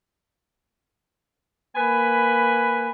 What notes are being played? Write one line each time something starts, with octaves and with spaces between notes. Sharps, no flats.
A#3 B4 G#5 B5